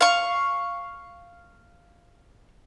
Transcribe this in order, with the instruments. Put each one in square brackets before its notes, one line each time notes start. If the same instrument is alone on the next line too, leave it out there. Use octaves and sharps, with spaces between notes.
[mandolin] F5 C#6